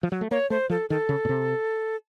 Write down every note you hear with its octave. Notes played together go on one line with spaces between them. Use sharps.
F3
F#3
A3
A#3 C#5
A3 C5
F3 A4
D#3 A4
C#3
A#2
C3